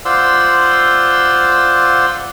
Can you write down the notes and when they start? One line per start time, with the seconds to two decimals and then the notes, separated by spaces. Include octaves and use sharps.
0.05 F4 C5 D5 F#5 C6 E6